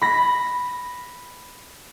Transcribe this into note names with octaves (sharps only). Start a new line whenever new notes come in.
B5 A#6